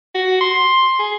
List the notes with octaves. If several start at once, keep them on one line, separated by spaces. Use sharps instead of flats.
F#4
C6
G#4